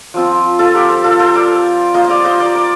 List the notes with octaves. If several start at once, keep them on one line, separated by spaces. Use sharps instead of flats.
F3 C4 F4
F4 A4
G4 A#4
A4 C5
F4 A4
A4 C5
A#4 D5
A#3 F4 C5 D#5
D#5
D5 F5
C5 D#5
A#4 D5
A#4 D5